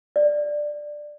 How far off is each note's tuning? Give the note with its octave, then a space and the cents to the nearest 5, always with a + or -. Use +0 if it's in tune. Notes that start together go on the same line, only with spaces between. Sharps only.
D5 +10